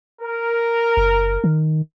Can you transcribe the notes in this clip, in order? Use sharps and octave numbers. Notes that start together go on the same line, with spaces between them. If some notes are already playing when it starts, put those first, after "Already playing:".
A#4
F#1
D#3